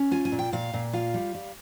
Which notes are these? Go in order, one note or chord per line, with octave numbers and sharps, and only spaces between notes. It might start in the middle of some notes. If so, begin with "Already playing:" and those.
Already playing: C#4
F4 G#5
G#5
A#2
G5
A#2 F5
A#2
F4 F5
G3
G3